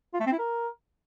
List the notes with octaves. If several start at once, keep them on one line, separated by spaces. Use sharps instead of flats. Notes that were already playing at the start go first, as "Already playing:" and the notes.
F4
A3
C4
E4
A#4